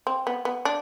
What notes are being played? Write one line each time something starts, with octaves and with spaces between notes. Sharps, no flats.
C4
B3
B3
D4